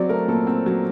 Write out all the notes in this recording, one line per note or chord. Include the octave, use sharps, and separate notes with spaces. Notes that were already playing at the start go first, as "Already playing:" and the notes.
Already playing: F#3 C4 D5
A3 A#4
A#2 A4
C4
F#3